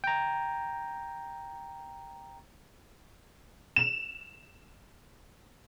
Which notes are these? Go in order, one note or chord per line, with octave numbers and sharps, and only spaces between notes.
G5 A#5
E7 F7